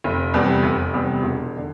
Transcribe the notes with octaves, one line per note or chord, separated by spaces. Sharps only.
F1
E2 C3 G3 B3
F1
E2 C3 G3 B3
E1
D3